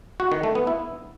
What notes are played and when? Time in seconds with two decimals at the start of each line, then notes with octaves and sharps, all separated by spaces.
0.20 F#4
0.32 D#3
0.43 A3
0.55 B3
0.67 E4